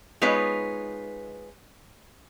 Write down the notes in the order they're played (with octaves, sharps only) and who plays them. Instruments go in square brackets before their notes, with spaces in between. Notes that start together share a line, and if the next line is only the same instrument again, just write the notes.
[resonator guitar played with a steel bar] G#3 B3 D#4 F4 B4 C#5